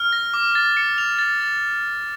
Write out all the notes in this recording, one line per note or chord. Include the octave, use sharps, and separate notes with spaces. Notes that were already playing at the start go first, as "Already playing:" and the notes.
Already playing: F6
A#6
D6
A6
C#7
F7
A6
A6